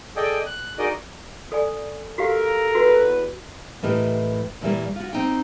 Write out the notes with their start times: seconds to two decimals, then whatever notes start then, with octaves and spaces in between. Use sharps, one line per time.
0.16 G#4 A4 D5 D#5 G5 G#5
0.46 F#6
0.79 D#4 F#4 G#4 A#4 D5 D#5
1.52 A4 D5 G#5
2.18 F#4 G4 A4 A#4 F5
2.75 E2 F#4 B4
3.83 A2 E3 G4 A#4 D#5
4.61 A#2 E3 G3 A#3
4.96 F4 F#4
5.13 C4 D#4 G5